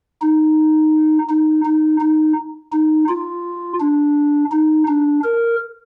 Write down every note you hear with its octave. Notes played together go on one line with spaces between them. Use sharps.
D#4
D#4
D#4
D#4
D#4
F4
D4
D#4
D4
A#4